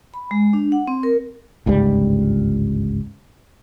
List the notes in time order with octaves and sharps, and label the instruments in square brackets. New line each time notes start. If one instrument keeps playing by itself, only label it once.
[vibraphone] B5
G#3
D4
F#5
C4
A#4
[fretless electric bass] G1 C#2 G#2 G3